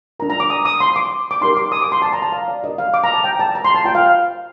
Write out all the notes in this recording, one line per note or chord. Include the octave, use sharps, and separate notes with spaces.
D4 F4 A#4 A#5
A#5
D6
D#6
D#6
C6
D6
D6
D#4 G4 A#4 C6
D6
D#6
D6
C6
A5
A#5
A5
F5
D5
D4 G4 A#4 D#5
F5
D6
A#5
A5
G5
A5
A#5
C6
A5
F4 C5 G5
F5